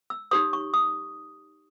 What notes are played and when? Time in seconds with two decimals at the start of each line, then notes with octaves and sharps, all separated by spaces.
0.10 E6
0.31 D#4 G4 C#5 D#6
0.53 C#6
0.74 D#6